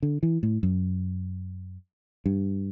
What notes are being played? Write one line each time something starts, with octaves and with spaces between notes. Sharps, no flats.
D3
E3
A2
F#2
G2